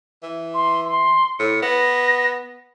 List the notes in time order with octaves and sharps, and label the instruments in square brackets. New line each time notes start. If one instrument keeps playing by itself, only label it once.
[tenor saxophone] E3
[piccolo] C6
C6
[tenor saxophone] A2 [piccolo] C#7
[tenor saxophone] B3 [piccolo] A#6